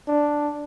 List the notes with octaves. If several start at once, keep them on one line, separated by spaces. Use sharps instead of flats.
D4